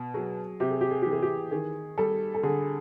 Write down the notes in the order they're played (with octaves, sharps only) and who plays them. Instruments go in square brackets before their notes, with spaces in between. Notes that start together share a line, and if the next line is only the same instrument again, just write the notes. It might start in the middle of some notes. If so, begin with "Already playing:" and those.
Already playing: [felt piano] B2
[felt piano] F#3 [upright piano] G#4
[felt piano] C3 [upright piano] G4
[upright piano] G#4
G4
G#4
[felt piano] E3 [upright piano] G4
[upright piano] G#4
G4
[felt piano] D#3 [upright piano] G#4
[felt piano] G3 [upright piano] A4
[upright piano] A4
[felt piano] D3 [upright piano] G#4